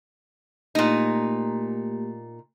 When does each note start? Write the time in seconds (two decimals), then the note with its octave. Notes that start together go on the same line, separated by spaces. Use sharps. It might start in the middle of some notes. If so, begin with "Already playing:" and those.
0.75 A#2 A3 A#3 D#4 G4